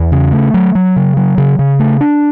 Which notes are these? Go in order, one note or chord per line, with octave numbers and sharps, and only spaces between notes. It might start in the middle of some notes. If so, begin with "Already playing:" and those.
Already playing: E2
C#3
A3
F#3
F#3
C#3
F#3
C#3
C#3
A3
D4